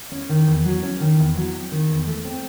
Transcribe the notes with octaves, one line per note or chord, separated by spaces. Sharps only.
C#4
D#3
E2
F#3
C#4
D#3
E2
F#3
C4
D#3
E2
A3
C4